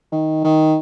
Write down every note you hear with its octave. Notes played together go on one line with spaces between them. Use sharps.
D#3
D#3